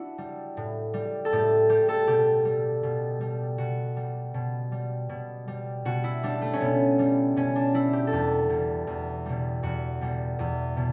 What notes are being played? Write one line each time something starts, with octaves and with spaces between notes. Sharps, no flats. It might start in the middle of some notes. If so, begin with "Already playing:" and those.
Already playing: D4 E4 F#4
G3
A2
G3
A4
A2 G4
G3 G4
A4
B2 G4
G3
B2
G3
B2 F#4
G3
B2
G3
B2
G3
B2 F#4
E4
G3 D4
A3
C#4
B2 B3
G3
B2 C#4
D4
G3 E4
G4
A4
E2 G4
B2 G3
E2
B2 G3
E2 F#4
B2 G3
E2
B2